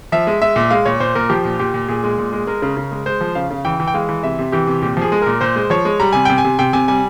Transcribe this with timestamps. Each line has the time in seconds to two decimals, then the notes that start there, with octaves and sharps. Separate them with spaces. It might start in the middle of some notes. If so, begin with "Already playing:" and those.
0.12 F3 E5
0.27 G#3
0.42 G#3 E5
0.56 A#2
0.70 G#3 F5
0.86 A#2 C#5
1.00 A#2 C5
1.15 A#2 A#4
1.30 F3 G4
1.44 A#2
1.59 A#2 G4
1.74 A#2
1.88 A#2 G#4
2.04 G#3
2.18 A#2
2.33 G#3
2.47 G#3 A#4
2.62 C#3
2.77 C#3
2.92 G#3
3.06 G#3 C5
3.21 F3
3.35 C#3 F5
3.51 C#3
3.65 E3 G5
3.80 E3
3.88 G5
3.94 G#3 F5
4.09 E3
4.23 C3 E5
4.39 C3
4.52 E3 G4
4.67 C3
4.82 A#2 G4
4.97 F3 G#4
5.12 G#3
5.22 A#2 A#4
5.41 A#2 C5
5.56 G#3
5.70 F3 C#5
5.85 G#3
6.00 G3 A#5
6.13 C3 G#5
6.25 C3 G5
6.38 G#5
6.44 C3
6.59 C3 G5
6.73 C3 G#5
6.88 G3 G#5